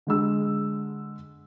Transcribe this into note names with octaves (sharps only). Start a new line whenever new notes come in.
D3 G#3 E6